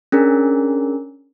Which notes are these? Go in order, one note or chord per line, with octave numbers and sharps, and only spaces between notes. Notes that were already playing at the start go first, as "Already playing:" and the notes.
C#4 D4 G#4 A#4